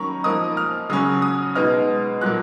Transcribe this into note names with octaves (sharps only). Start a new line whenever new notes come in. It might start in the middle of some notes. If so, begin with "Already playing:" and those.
Already playing: D#3 F#3 A#3 C#4 A#5 B5 C#6
F3 A#3 D#4 D#6
F6
C#3 F#3 C#4 D#6
D#6
B2 G#3 B3 D#4 F6
A#2 F#3 A#3 F#6